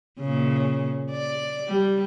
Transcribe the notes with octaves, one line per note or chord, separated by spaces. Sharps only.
A#2 C#3
D5
G3